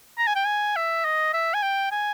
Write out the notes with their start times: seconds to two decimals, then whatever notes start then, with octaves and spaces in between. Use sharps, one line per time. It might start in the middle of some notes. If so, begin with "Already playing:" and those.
0.18 A#5
0.27 G#5
0.36 G5
0.45 G#5
0.76 E5
1.05 D#5
1.34 E5
1.54 G#5
1.63 G5
1.92 G#5